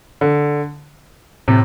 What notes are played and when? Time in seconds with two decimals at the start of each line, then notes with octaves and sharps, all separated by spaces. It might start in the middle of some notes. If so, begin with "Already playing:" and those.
0.21 D3
1.48 A2 C3